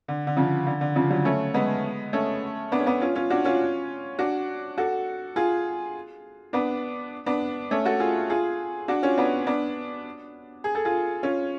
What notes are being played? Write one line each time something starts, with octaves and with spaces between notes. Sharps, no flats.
D3
D3
C#3 F3
D3
D3
C#3 F3
D3 F#3
A3 C#4
G#3 B3
A3 C#4
B3 D4
C#4
B3 D4
C#4 F4
C#4 F4
D4 F#4
C#4 F4
D4 F#4
F#4 A4
F4 G#4
B3 D4
B3 D4
A3 C#4
F#4 A4
F4 G#4
F4 G#4
D4 F#4
C#4 F4
B3 D4
B3 D4
G#4
A4
F4 G#4
C#4 F4